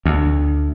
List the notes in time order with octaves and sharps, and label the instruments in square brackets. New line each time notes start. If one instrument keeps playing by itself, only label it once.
[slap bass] D2